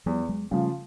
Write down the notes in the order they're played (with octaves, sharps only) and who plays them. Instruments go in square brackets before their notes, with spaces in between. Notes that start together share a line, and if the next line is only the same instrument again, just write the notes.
[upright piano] E2 [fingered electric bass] F3 G3
[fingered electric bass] F#3 G#3
[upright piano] C#3 F3 [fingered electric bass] G3 A3